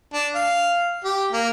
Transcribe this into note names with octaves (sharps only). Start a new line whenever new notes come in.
D4
F5
G4
A#3